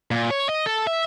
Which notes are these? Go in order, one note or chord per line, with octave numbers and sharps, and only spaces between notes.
A#2
C#5
D#5
A4
E5